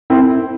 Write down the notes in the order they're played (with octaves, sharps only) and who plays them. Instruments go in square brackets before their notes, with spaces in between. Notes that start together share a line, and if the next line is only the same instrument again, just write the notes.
[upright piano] C4 E4